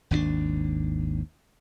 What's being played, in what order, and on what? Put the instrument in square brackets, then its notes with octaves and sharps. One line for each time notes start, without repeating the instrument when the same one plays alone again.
[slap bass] G#1 D#2 C4 D4